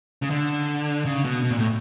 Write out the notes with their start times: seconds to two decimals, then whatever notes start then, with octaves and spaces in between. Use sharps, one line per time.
0.23 C#3
0.30 D3
1.05 C#3
1.25 B2
1.43 B2
1.51 A#2
1.58 A2